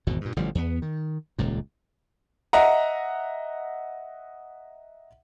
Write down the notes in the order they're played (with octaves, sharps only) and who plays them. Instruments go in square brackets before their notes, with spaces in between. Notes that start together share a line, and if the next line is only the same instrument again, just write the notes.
[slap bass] G#1 E2 B2
G2 A#2
A1 D3 F3 G3
E2 F#3 B3
D#3
D#1 C#2 A#2
[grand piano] D#5 E5 F#5 A#5